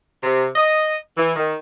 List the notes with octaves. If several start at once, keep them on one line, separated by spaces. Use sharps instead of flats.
C3
D#5
E3
D#3